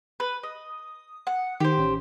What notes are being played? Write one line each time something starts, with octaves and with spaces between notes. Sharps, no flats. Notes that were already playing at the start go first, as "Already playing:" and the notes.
B4
D#5 D#6
F#5
D#3 G4 C5
A1 C#4